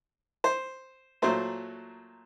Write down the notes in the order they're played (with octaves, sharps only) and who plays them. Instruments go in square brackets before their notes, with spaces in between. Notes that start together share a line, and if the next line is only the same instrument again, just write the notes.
[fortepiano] C5
A#2 F#3 A3 C5